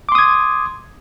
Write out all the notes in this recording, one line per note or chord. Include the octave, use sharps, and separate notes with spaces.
C6 D6 D#6 G#6